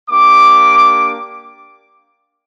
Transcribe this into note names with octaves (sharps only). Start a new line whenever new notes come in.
A#3 D4 G4 D6